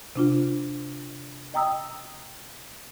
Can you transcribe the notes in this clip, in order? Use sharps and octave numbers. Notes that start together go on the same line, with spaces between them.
C3 D4 F4
D#5 G5 A#5 D#6 E6